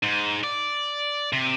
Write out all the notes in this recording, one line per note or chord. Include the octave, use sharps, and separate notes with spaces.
G#2
D5
C3